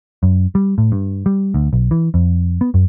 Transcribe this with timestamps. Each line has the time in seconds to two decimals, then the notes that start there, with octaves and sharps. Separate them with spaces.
0.23 F#2
0.55 G3
0.78 A2
0.92 G2
1.26 G3
1.54 D2
1.73 B1
1.91 E3
2.14 F2
2.61 B3
2.74 F#2